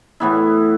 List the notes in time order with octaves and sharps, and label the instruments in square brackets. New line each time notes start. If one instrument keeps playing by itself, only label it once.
[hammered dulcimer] A2 E3 B3 E4